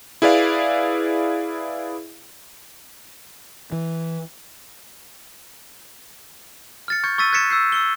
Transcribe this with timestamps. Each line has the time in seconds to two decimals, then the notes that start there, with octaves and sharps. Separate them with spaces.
0.22 E4 G#4 B4 D5 F5
3.72 E3
6.88 F6 A6 C#7
7.03 C#6 G6 G#6 C#7
7.18 C#6 E6 A6 B6 D#7
7.32 F#6 G#6 A6 B6 C#7 E7
7.50 E6 G6 C7
7.72 E6 C#7 G7